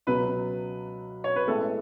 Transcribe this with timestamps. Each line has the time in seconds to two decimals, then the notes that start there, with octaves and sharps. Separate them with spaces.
0.07 C#2 B2 F#3 B4
1.24 C#5
1.36 B4
1.48 A1 A2 G#3 B3 A4